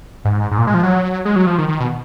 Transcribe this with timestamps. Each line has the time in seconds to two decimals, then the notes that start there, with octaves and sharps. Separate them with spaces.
0.25 G#2
0.51 G#2
0.58 A#2
0.67 G#3
0.74 F3
0.83 F#3
1.25 G#3
1.36 F#3
1.47 F3
1.58 D#3
1.68 D#3
1.80 B2